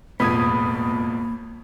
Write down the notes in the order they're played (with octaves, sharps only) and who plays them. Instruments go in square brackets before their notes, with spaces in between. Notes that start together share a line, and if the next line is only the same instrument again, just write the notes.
[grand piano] E1 F2 A2 [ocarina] A#3 [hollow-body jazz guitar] B3 [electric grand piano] B5 D#6 G#6